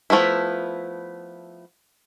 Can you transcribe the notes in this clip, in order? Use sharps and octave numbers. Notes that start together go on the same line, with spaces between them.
F3 A3 B3 E4